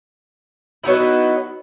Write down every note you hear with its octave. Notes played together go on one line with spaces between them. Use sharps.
F#3 B3 D#4 E4